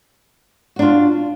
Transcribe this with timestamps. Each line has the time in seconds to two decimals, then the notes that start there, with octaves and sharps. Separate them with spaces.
0.76 F#4
0.79 D4
0.82 F4